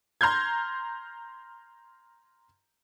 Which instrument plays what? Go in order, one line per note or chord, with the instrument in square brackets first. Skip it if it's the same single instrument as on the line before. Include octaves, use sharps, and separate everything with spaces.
[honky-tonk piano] A#5 C6 F6 G6 G#6